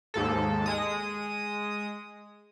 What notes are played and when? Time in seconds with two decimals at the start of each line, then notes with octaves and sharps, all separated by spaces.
0.14 D#2 G#2 A4
0.66 G#3 D#6